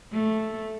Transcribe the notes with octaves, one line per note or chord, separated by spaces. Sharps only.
A3